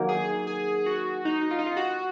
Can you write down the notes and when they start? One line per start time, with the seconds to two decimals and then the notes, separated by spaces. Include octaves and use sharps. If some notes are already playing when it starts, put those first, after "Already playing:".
Already playing: D#3 F#3 A#3
0.09 G#4
0.47 G#4
0.86 F#4
1.25 D#4
1.51 F4
1.59 D#4
1.66 F4
1.77 F#4